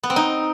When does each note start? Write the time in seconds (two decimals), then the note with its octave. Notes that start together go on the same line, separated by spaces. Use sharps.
0.03 B3
0.10 C4
0.16 D#4